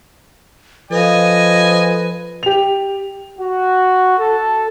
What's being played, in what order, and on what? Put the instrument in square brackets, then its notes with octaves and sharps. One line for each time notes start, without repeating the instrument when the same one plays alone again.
[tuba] F3 [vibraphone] A4 F5 [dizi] B4 [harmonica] D#5 G#5
[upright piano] G4 F7
[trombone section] F#4
A4